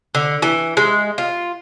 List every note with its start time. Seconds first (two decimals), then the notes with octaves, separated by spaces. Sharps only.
0.15 D3
0.42 E3
0.77 G#3
1.18 F4